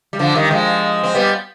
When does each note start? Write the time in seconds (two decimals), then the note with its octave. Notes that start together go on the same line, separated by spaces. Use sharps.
0.13 G3
0.19 D3 F3
0.35 D#3 G3
0.51 F3 G#3
1.04 C4
1.15 G3 B3